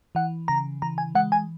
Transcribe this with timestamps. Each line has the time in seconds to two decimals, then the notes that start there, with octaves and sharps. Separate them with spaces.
0.15 E3 F#5
0.48 C#3 A#5
0.82 E3 A#5
0.98 G#5
1.15 G#3 F#5
1.32 G#5